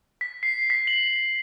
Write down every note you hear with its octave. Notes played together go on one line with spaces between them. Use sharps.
B6
C7
B6
F#7